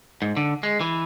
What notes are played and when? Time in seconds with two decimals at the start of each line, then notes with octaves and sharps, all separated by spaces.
0.22 G#2
0.37 D3
0.63 G#3
0.81 E3